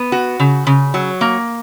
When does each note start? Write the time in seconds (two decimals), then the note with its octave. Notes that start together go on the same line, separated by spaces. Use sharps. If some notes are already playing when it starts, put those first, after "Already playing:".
Already playing: B3
0.12 F#4
0.40 C#3
0.67 C#3
0.94 F#3
1.21 A#3